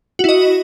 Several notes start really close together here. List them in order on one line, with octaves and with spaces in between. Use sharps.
F#4 E4 D#5